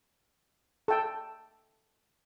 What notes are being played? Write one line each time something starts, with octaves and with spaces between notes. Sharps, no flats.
A4 G5